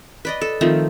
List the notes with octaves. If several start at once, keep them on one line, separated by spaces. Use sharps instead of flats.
B4 D5 D#5
A4
D#3 F3 A3 C4